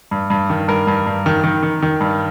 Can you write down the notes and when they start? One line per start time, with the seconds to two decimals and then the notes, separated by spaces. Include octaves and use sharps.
0.11 G2
0.30 G2
0.50 D#3
0.68 G2 A#4
0.87 G2
1.07 G2
1.26 D#3
1.44 D#3
1.63 D#3
1.83 D#3
2.00 G2